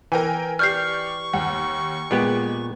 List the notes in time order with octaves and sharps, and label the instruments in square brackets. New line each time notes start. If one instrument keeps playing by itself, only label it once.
[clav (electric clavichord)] E3 [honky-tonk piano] A#4 G5 G#5
[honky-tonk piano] G4 D5 [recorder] C#6 [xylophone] F6 G6 C7
[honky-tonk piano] D#2 [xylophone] F#5
[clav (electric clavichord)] A#2 B3 G4 [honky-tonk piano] G#3